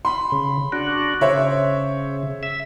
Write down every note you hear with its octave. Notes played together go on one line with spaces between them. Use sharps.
B5 C6
C#3
D4 F#4
C#3 C5 C#5 E5
E5